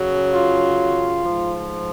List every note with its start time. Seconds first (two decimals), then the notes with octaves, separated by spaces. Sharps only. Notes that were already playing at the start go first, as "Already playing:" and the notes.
Already playing: F#2 C#3 F#3
0.34 F4
1.26 G#2 F3